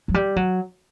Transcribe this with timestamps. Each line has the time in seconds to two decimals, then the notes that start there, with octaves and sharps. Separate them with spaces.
0.08 F#3
0.14 G3
0.36 F#3